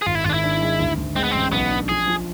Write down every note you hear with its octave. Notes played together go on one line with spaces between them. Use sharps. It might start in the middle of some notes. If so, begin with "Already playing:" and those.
G#4
G#1 F4
E4
G#1 D4 F4
E4
D4
G#3
D2
D2
G#3 C4
B3
A1 C4
B1 B3
D4
F3 G#4
F3